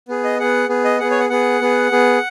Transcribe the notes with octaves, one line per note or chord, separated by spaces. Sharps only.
B3 G#4
D#5
B3 G#4 F#5
B3 G#4
D#5
B3 G#4 F#5
C#5
F#5
B3 G#4 F#5
B3 G#4
B3 G#4